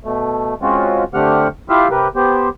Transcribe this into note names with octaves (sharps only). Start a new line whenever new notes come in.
B2 A3
G#3 C4 C#4 F4 F#4
D3 A3 C4 G4 F#5 F6
E4 F4 G4 E5 F5
C3 G4 A#4 B4
B3 G4 C5